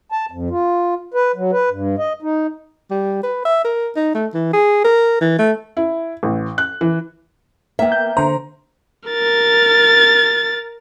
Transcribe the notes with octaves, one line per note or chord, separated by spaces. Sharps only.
A5
F2
F4
B4
F#3
B4
G2
D#5
D#4
G3
B4
E5
A#4
D#4
A3
E3
G#4
A#4
E3
A3
E4
A1
F#6
E3
A#3 B3 E5 G5
G6
D3 C5 A#5
A#4 A6